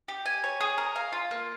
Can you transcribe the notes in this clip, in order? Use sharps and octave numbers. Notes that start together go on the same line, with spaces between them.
G4
G#5
C#5
G#4
A#4
F5
F4
A#3